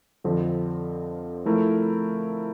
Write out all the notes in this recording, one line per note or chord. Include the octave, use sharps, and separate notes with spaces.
F2 D3 F3 C4
F3 A3 E4 A#4